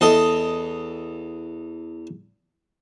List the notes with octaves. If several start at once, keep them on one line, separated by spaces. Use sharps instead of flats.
E2 A4 D#5